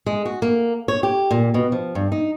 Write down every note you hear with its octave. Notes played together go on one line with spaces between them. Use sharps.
G#3
F#4
A#3
C#5
G4
A#2
B2
F3
G2
D#4